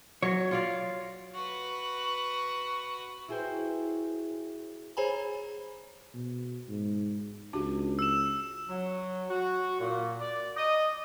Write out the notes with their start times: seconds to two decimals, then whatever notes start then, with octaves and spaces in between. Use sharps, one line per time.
0.22 F#3 C#5
0.51 F4 D5 F5
1.34 F#4 B4
3.28 E4 F#4 G#4 C5 G5 C6
4.97 G#4 C5 C#5 G#5 A#5 B5
6.14 B2
6.69 G#2
7.53 C#2 D4 F#4 G4
7.99 E6 E7
8.69 F#3
9.30 F#4
9.80 A#2
10.21 D5
10.57 D#5